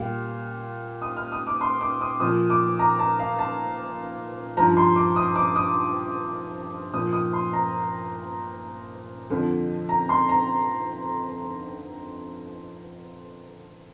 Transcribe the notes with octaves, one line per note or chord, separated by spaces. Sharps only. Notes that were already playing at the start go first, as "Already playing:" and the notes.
Already playing: A#2 G3 F5
D#6
F6
D#6
D6
C6
D6
D#6
A#2 F3 D#6
D6
A#5
A5
F5
A5
G2 F3 A#5
C6
D6
D#6
D6
D#6
A#2 F3 D#6
D#6
C6
A#5
F2 D3 F3
A#5
C6
A#5